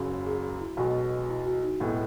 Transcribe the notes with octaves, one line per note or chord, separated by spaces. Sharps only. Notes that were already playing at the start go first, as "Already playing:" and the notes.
Already playing: F#1 F#2 C#3 F#4
G#4
G#4
E4
B1 B2 G#3 F#4
F#4
E4
F#4
D#4
B1 A2 G#3 B3 E4